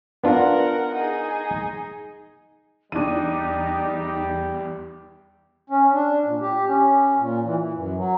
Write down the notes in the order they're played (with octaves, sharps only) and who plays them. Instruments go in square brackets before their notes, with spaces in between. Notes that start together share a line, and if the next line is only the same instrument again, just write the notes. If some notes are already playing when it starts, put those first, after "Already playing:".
[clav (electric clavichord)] B3 D4 F4 [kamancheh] A#4 F#5
[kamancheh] D#4 G#4
[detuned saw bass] E2 [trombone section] G3 G4 [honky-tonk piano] D4 D#7 [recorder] D#4
[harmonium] C#4
D4
A#2
G4
C#4
A#2
E3
E3
F#2
F#3